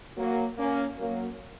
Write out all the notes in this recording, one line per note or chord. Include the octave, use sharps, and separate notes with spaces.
F#3 A#3
A#3 C#4
F#3 A#3